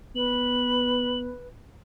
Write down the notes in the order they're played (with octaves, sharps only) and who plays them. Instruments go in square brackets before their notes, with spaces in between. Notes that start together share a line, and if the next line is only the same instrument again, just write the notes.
[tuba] B3 [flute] B4 [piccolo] F#7